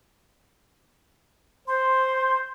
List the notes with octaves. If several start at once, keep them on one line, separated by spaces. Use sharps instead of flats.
C5 C6